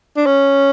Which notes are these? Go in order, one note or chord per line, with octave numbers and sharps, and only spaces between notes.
D4
C#4